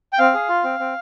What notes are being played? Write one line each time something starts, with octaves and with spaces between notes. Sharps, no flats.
G5
C4 F5
G#4
F4
C4
C4